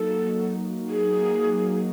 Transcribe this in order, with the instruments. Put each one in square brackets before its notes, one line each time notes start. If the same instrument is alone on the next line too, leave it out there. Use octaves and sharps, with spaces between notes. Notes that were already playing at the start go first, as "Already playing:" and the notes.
Already playing: [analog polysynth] F#3 A#3 D#4 [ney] A4
[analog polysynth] F#4
F#3
D#4
A#3
F#4
[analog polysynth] F#3 [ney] G#4
[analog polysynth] D#4
A#3
F#4
F#3
D#4